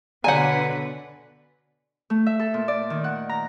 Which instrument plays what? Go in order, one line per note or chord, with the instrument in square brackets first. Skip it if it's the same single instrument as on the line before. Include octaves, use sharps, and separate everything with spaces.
[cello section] B2 D3 B4 [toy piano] C#5 D5 A#5 [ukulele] F#5 G#5
[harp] A3
E5
A4
A#2
D5
D#3
F#5
A#5